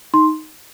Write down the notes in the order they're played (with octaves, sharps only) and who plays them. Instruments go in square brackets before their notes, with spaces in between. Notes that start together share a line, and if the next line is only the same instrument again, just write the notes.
[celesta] D#4 C6